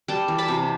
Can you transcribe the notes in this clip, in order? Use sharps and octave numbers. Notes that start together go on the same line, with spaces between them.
G3 G5 A5
E3
A5 B5
C3